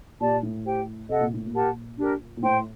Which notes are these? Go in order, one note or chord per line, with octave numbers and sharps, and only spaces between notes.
A#2 G4 D5 A5
A2
G4 C5 G5
C3 A4 D#5 F#5
A#2
A2
A#2
G4 A#4 F#5 A5
D4 G4 A#4
A#2
A2 C5 G5 C6